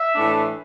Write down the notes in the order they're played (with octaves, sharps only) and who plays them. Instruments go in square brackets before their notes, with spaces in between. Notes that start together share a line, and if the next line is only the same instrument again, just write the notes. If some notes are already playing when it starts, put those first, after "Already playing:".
Already playing: [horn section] E5
A2 E3 A3 D4